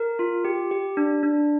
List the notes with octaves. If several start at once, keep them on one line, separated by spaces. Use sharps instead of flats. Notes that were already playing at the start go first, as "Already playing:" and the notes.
Already playing: A#4
F4
G4
G4
D4
D4